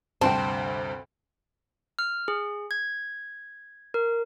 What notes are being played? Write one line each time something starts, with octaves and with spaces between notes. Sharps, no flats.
D2 G2 C3 C4 G5 A5
F6
G#4
G#6
A#4